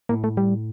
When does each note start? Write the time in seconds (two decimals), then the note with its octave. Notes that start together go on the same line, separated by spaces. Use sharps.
0.09 A2 A#3
0.24 A3
0.37 G3